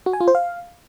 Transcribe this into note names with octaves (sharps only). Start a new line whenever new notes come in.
F#4
G#5
F4
C5
F5